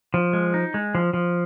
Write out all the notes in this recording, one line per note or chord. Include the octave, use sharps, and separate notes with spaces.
F3
G#3
D#4
G#3
F3
F3